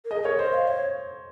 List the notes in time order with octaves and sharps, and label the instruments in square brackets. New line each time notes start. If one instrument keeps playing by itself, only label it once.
[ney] A#4
[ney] G#4 [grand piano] D#5
[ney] A#4 [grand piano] C#5
[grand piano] C5 [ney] D#5
[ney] F5
C#5